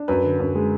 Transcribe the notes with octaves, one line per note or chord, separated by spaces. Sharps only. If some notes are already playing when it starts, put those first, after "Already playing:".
Already playing: D4
F#2 B4
D3
F#2
G#3